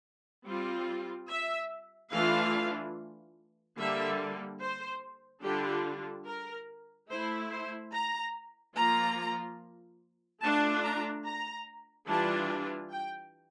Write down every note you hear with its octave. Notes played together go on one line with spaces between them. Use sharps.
G3 C4 F4
E5
E3 A3 D4 F4 F5
D3 G3 A#3 E5
C5
D3 G3 D4 F4 G4
A#4
A3 E4 C5
C5
A#5
F3 A#3 F4 A#5
A3 D4 F4 A5
A#5
A#5
E3 G3 D4 F4 A5
G5